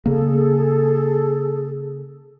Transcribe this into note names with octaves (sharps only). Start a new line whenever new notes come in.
C#3 A#3 G#4 A4